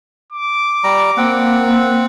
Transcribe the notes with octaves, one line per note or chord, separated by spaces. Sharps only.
D6
G3 A#5
A#3 C4 F#5